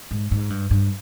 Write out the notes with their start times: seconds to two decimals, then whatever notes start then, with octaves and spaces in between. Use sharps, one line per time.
0.11 G#2
0.31 G#2
0.50 G2
0.71 G2